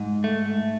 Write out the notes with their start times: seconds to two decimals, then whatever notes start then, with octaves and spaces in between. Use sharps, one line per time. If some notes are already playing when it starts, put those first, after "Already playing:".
Already playing: G#2
0.24 A3